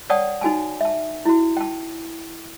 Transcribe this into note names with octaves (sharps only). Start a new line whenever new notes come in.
C#5 D5 F#5 G5 A5 D#6
D#4 F#4 G#5 A5
E5 A5
E4 F#4
G5 A5